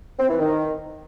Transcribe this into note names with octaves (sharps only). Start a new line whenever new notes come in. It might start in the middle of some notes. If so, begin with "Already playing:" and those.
C4
E3
D#3